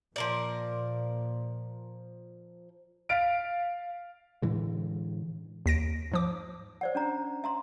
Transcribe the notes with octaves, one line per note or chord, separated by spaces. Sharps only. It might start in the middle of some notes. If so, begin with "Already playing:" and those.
A#2 F3 A#4 D5
F5 F6 A6 B6 D7
A2 D3 E3 G#3
D#2 A#6 D7
G#2 F3 D6
C5 D5 F#5
C#4 D4 A#5
E5 A#5 C6